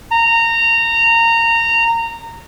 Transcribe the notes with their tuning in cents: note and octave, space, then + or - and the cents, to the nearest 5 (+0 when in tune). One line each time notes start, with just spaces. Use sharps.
A#5 -20